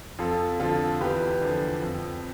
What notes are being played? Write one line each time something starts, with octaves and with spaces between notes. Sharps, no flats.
F2 F4 A4
D3 F3 F4 A4
E2 G4 B4
D3 F3
F2